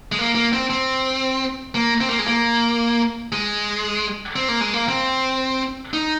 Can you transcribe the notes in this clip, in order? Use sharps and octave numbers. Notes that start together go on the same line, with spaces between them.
G#3
A#3
A#3
C4
C4
A#3
C4
A#3
G#3
A#3
G#3
C4
A#3
G#3
A#3
C4
D#4